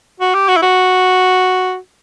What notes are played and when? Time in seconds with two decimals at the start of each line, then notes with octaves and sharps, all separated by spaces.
0.20 F#4
0.34 G4
0.48 F#4
0.56 E4
0.62 F#4